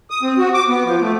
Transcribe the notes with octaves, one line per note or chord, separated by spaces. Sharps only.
D#6
C4
F#4
D6
B3
F3
A3